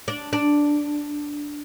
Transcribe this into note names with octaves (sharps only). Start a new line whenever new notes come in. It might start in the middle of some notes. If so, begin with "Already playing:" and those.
D4
D4